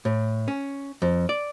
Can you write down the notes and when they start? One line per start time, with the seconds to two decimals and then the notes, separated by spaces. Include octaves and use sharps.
0.05 A2
0.48 C#4
1.02 F2
1.29 D5